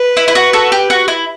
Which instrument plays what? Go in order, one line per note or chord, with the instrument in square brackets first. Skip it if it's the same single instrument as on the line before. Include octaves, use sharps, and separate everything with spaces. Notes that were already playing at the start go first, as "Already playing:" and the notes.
Already playing: [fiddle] B4
[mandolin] E4
E4
F#4
F#4 A4
G4
F#4
E4